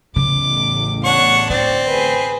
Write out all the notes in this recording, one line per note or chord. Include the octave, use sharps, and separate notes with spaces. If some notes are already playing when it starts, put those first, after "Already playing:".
A1 E2 C#3 D6
D4 C#5 F#5 C#6
D3 C4 D5
G#4 B4